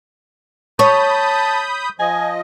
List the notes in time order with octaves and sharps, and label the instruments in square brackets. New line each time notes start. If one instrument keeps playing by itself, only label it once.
[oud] C#5 [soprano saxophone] A5 [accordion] B5 D#6 G6
[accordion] F3 D#5 [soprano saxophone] G#5